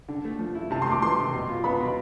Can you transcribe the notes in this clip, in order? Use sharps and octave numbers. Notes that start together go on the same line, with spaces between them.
D3
A3
F3
E4
C3 A5
C6
A3 D6
E3 C6
C3
B2
F4
B3 B5
B2